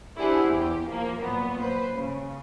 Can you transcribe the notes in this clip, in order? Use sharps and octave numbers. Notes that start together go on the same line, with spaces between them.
D4 E4 G4 G#4 C5 F#5
E2 G4
F3 A#3
A#2 F#3 B3
B4 C5
C#3